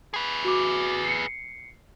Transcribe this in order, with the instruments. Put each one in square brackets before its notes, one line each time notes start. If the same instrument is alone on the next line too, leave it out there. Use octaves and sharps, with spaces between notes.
[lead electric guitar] G#4 B4
[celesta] F#4 D6
C7 C#7